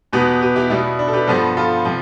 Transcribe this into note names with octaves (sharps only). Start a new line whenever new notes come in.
E2 B2 B3 G4 B4
G4 B4
E4 G4
B2 G3 B3 E4
D4
A4
G4 B4
G2 F3 B3 A4 C5
F4 A4
C3 F3